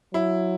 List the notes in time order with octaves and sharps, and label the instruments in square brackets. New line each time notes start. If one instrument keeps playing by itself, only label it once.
[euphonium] F#3 [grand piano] E4